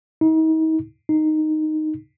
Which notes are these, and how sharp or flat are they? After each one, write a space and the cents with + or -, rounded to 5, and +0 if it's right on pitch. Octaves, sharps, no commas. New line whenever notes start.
D#4 +40
D#4 -5